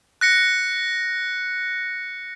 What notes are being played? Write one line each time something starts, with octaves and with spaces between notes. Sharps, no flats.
F#6 A#6 C#7